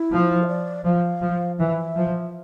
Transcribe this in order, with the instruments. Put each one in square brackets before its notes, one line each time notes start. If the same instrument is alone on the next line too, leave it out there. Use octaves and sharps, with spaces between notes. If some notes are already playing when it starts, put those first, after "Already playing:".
Already playing: [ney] E4
[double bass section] F3
[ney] E5
D5
[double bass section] F3 [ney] F5
[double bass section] F3
[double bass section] E3 [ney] E5
[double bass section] F3